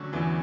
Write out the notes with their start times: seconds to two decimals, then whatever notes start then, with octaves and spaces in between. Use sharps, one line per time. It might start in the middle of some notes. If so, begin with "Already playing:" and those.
Already playing: D3 F#3 A3 C#4
0.13 E2 E3